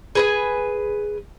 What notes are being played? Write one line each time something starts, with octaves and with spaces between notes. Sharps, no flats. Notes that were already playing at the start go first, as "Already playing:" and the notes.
G#4 B4 G#5